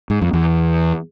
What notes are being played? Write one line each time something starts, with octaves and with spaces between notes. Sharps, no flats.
G#2
F2
E2